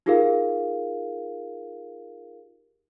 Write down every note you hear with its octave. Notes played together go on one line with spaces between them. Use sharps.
D#4 F4 G4 G#4 A#4 F5